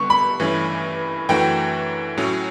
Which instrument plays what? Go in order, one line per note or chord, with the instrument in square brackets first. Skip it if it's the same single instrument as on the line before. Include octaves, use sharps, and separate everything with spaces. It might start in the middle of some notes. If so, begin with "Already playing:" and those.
Already playing: [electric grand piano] D3 G3 B3 D4 [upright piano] C#6
[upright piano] B5
[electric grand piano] G2 E3 A3 C#4
[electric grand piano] F#2 E3 A3 D4 F#4 [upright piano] G5
[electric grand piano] A2 F#3 C#4